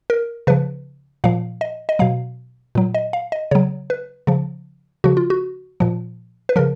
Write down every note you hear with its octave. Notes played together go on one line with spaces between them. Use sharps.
A#4
C#3 F3 B4
A#2 F3 F5
D#5
D#5
B2 F#3 F5
A#2 F#3
D#5
F5
D#5
C#3 F#3 C#5
B4
C#3 F3
C#3 F3 F#4
F4
F#4
A#2 F3
B4
C#3 F3 A#4